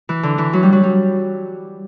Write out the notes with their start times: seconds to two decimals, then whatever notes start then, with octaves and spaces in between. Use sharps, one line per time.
0.09 E3
0.23 D3
0.38 E3
0.53 F#3
0.63 G3
0.73 F#3
0.83 G3